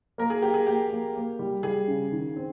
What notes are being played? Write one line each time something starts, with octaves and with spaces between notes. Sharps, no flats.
A#3 A#4
G#4
A#3 G4
G#4
A#3 G4
A#3
A#3
G3
G3 G#4
C#3
D#3
C4